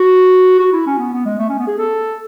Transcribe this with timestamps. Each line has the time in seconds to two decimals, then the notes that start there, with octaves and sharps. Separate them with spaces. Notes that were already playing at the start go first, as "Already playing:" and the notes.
Already playing: F#4
0.59 F#4
0.72 E4
0.87 C#4
0.99 B3
1.13 B3
1.25 G#3
1.38 A3
1.49 C#4
1.58 B3
1.67 G#4
1.78 A4